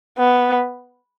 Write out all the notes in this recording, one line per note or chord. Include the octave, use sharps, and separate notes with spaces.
B3